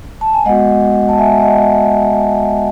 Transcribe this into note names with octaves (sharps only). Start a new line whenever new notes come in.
A5
G#5
G#3 B3 F#4 D#5 F#5
A5
E5 G#5
D#5 F#5